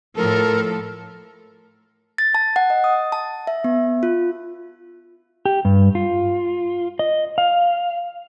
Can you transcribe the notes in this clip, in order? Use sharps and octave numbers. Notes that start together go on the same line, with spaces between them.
A2 F3 A4 A#4
A6
A5
F#5
D#5
D#6
A5
E5
B3
F4
G4
G2
F4
D#5
F5